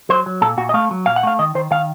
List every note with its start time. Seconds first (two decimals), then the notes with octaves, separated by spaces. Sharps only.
0.09 F#3 C5
0.26 F#3
0.41 A#2 A4
0.58 A#2 F#4
0.69 D#5
0.74 A3 F5
0.91 F#3
1.06 A#2 F5
1.16 F#5
1.23 A3 F5
1.39 D#3 D#5
1.55 D#3 C5
1.71 D#3 F5